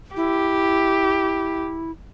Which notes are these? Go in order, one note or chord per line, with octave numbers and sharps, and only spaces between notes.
E4 G4